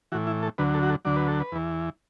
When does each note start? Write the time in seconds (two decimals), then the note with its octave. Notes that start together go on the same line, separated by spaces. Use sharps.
0.12 A2 E3 F#4
0.27 E4
0.43 A4
0.58 D2 D3 F#3 B4
0.74 A4
0.83 F#4
0.89 A4
1.05 D2 D3 F#3 D5
1.16 B4
1.28 A4
1.40 B4
1.52 E2 E3